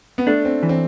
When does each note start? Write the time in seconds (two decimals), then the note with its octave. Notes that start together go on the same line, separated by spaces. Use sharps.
0.18 B3
0.27 A3 D4
0.45 C4
0.63 E3
0.69 C4